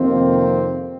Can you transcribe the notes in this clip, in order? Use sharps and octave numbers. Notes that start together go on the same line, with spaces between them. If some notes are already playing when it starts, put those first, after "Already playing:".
Already playing: F2 C3 D#3 A#3 C4